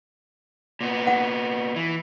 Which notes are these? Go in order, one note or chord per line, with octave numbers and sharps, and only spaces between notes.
A#2 B3
F#5
E3